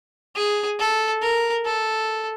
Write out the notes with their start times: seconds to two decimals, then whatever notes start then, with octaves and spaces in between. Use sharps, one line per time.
0.36 G#4
0.79 A4
1.22 A#4
1.65 A4